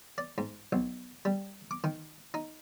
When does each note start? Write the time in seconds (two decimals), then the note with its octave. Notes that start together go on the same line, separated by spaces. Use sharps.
0.18 D5
0.38 G#2
0.72 B1
1.25 G3
1.71 D6
1.84 D#3
2.34 D#4